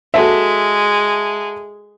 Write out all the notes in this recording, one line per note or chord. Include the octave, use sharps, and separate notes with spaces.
G#3 F#4 A4 E5